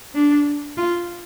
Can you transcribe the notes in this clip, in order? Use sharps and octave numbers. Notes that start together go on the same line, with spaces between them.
D4
F4